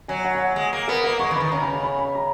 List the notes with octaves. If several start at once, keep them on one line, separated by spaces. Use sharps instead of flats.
F#3 G#5
F#5
G#5
F#5
G#3 G#5
A#3
B3 A#4
A#3 F#5
G#3 C#6
E3
D#3 B5
C#3 A#5
G#5
G#5
B5
B5
A#5